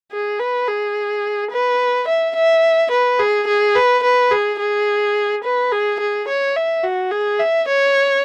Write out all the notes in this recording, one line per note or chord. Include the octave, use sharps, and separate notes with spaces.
G#4
B4
G#4
B4
E5
E5
B4
G#4
G#4
B4
B4
G#4
G#4
B4
G#4
G#4
C#5
E5
F#4
G#4
E5
C#5